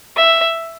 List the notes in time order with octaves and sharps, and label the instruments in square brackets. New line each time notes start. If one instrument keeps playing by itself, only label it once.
[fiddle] E5